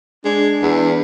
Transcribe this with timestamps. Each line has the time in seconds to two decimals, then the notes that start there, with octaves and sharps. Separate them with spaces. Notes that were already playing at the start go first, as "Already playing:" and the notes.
0.25 G#3 D4
0.62 E2